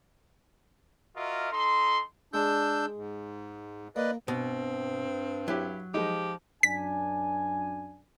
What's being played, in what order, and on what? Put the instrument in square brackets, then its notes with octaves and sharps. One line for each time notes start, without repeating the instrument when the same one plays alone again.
[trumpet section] F4 F#4 A#4 D#5 E5
D#4 A4 C6
[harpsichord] G#3 [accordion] D4 E6 G6
[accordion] G#2
[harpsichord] A#3 [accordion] B4 D5 D#5
[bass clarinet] G2 [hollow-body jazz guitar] B2 [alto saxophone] C4
[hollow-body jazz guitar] F#3 [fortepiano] E4 G4
[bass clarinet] F3 [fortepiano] G#3 D#4 [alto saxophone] G4
[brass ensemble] F#2 D4 G#5 [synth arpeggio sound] B6